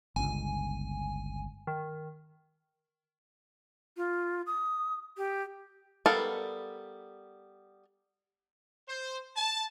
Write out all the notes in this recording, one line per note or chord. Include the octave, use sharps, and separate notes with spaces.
G1 C#2 G#5
D#3
F4
D#6
G4
G3 B3 A4 A#4 F5
C5
A5